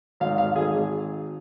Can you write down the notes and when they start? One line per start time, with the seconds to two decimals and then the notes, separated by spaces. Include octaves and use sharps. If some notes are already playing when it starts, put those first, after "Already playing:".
0.20 G#1 F5
0.38 F5
0.56 G#1 G#4